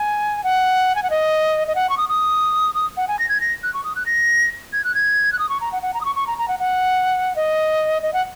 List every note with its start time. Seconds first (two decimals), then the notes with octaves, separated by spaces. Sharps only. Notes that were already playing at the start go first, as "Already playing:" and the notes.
Already playing: G#5
0.44 F#5
0.95 G#5
1.03 F#5
1.10 D#5
1.68 D#5
1.75 F#5
1.90 C#6
1.97 D#6
2.09 D#6
2.74 D#6
2.97 F#5
3.08 G#5
3.19 A#6
3.29 G#6
3.41 A#6
3.63 F#6
3.74 C#6
3.84 D#6
3.96 F#6
4.06 A#6
4.73 G#6
4.84 F#6
4.94 G#6
5.33 F#6
5.39 D#6
5.49 C#6
5.61 A#5
5.72 F#5
5.82 F#5
5.94 A#5
6.01 D#6
6.05 C#6
6.15 C#6
6.27 A#5
6.38 A#5
6.48 F#5
6.59 F#5
7.36 D#5
8.02 D#5
8.13 F#5